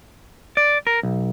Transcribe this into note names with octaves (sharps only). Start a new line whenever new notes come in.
D5
A#4
B1